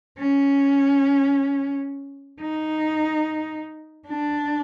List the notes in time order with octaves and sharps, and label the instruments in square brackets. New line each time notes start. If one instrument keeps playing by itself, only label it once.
[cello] C#4
D#4
D4